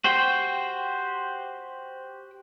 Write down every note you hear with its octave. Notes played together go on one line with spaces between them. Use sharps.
F#4 G4 C5 G5